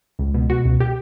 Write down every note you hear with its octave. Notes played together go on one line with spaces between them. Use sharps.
C#2
B2
B2 F#4
C#2
G4